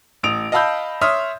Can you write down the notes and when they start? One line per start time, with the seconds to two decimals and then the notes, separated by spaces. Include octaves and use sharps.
0.23 A1 D#6 D7 F7
0.52 D#5 F5 A5 B5 E6 G6
1.01 C#5 E5 C6 D#6 F6